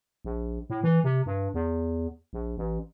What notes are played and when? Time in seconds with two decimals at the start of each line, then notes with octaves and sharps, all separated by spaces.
0.25 A#1
0.70 A2
0.83 E3
1.04 C3
1.26 G2
1.54 E2
2.33 A#1
2.57 A1